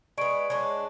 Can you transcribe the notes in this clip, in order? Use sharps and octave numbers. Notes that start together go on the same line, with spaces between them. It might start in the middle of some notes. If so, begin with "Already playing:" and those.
G#3 B3 D5 C#6 D7
G#3 B3 D4 C#5 C#6